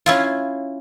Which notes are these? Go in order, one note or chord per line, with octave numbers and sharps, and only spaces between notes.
C#4 E4 F4